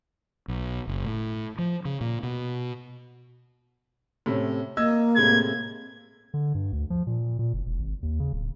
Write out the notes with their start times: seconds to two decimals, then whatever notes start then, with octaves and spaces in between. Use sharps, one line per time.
0.48 B1
0.88 F#1
1.05 A2
1.58 F3
1.85 C#3
2.01 A#2
2.23 B2
4.26 A2 C3 C#4
4.77 A#3 D#5 E6 G#6
5.16 A2 C3 G#3 G#6
6.34 D3
6.55 G2
6.73 D2
6.90 F3
7.07 A#2
7.39 A#2
7.53 F#1
7.66 E1
7.80 G#1
8.03 D#2
8.20 C#3
8.33 D1